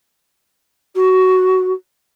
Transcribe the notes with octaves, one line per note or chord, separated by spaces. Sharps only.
F#4